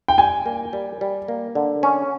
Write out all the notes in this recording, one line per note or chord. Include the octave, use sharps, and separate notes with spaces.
G5
G3 G#5
A#3
G3
G3
A#3
D3
C#4